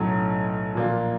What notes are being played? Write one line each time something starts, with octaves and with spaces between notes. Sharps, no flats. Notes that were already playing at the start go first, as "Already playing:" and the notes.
Already playing: B1 A2 F#3 A3 C#4
A#2 F3 A#3 D4 F4